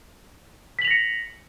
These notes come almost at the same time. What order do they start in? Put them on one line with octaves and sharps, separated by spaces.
B6 F#7 F7 A#6 C#7